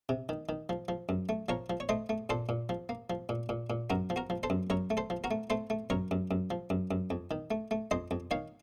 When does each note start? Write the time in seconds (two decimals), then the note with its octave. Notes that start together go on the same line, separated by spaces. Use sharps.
0.09 C3
0.29 D#3
0.49 D#3
0.69 F3
0.88 F3
1.09 F#2
1.29 A3
1.49 F3 A#4 C#5
1.70 F3
1.80 C#5
1.89 A3 C5 D#5
2.09 A3
2.30 A#2 A4 C5
2.49 A#2
2.69 F3
2.89 A#3
3.10 F3
3.29 A#2
3.49 A#2
3.70 A#2
3.90 F#2 F#4 A#4
4.10 F3
4.16 F#4 A#4
4.30 F3
4.43 A4 C5
4.50 F#2
4.70 F#2 A#4 C#5
4.90 A3
4.97 A4 C5
5.10 F3
5.24 F#4 A#4
5.31 A3
5.50 A3 A4 C5
5.70 A3
5.90 F#2 A#4 C#5
6.11 F#2
6.31 F#2
6.50 F3
6.70 F#2
6.91 F#2
7.10 F2
7.31 D#3
7.51 A3
7.71 A3
7.91 F2 C5 D#5
8.11 F2
8.31 D#3 C#5 F5